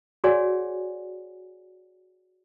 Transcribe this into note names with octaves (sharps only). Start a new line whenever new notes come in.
F#4 G#4 C#5 D5 F#5 G#5